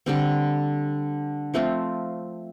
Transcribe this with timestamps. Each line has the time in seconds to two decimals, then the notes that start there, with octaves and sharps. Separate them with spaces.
0.06 D3 G3 C4
1.54 F3 A3 C4 F4